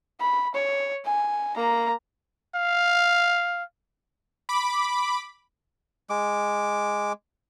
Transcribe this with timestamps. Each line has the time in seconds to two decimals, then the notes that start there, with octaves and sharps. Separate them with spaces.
0.20 B5
0.54 C#5
1.05 G#5
1.56 A#3 A#5
2.56 F5
4.49 B5 D6
6.10 G#3 D6